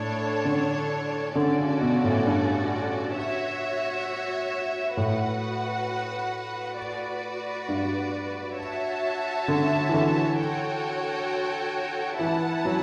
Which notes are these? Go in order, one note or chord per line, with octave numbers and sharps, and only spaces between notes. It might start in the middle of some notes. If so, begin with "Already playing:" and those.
Already playing: A2 D4 A4 C#5
D3
D3 C#4 F#4 A4 D5
C#3
B2
A2
G2
F#4 C#5 E5
A2 F#4 B4 F#5
F#4 B4 D5
G2
F#4 C#5 E5 A5
D3
E3
D3
F#4 A4 C#5 G5
E3 E4 B4 F#5 A5
F#3